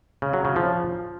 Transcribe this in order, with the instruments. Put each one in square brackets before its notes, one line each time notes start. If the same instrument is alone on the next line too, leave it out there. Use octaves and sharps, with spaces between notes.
[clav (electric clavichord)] C#3
F#3
C#3
F3